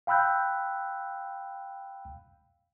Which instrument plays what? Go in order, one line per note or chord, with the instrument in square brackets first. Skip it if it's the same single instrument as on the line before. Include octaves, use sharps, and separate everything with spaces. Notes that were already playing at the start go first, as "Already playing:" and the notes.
[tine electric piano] F5 G5 B5 E6 F#6 G6